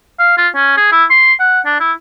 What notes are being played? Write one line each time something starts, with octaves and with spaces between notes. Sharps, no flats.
F5
F4
C#4
G#4
E4
C6
F#5
D4
E4